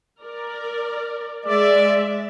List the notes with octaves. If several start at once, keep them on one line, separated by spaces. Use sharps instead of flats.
A#4 D5
G#3 D5 E5